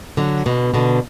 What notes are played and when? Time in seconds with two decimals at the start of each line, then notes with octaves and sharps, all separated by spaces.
0.17 D3 F#3
0.46 B2 D3
0.74 B2 D3